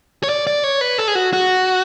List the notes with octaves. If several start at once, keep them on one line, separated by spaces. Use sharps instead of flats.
C#5
D5
D5
C#5
B4
A4
G#4
F#4
F#4